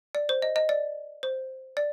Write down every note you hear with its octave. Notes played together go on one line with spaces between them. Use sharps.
D5
C5
D#5
D#5
D5
C5
D5